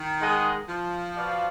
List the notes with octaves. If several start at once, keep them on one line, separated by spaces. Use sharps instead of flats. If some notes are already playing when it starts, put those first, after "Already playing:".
Already playing: D#3
G#3 D#4 G#4 D#5 F#5
F3
F#4 B4 D5 F5